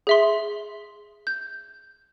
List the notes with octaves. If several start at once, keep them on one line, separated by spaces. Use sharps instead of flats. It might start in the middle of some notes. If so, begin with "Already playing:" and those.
G#4 E5 C6
G6